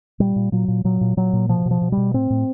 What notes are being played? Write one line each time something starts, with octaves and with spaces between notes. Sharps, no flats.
A#2 G3
A#2
A#2 F#3
A#2
A#2 F#3
A#2
A#2 F#3
A#2
B2 F3
B2
F3
B2
G3
B2
A2 C4
A2